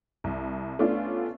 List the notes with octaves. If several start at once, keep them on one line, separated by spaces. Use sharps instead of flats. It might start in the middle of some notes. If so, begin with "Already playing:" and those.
C2
A3 B3 C#4 D4 F4